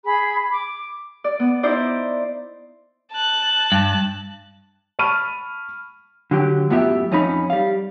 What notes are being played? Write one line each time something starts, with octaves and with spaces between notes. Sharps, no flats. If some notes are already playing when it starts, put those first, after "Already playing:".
G#4 B5
D6
D5
B3
D#4 E4 C5 D5
A5 F#6
G2
A5 B5 C#6 F6 D#7
D3 F#3 G4
F#2 A2 B3 F4 G4 E5
F2 C#4 D#4 B5
G3 F5